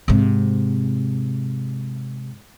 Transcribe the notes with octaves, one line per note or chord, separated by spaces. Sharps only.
G#2 C3